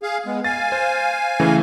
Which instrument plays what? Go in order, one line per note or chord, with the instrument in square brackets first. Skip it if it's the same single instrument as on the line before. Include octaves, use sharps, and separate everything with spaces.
[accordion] G#4 F5
G#3 B3
[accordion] F5 G#5 [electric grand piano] A6
[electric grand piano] C5
C#3 E3 A3